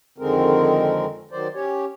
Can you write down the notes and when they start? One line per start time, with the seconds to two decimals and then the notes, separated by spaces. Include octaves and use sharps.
0.18 F2 D3 D#3 G#3 C4 A#4
1.31 D#3 F#3 C5 D5
1.54 C#4 G4 C#5